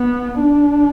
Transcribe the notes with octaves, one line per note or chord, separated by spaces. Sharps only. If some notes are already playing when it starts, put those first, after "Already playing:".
Already playing: B3
D4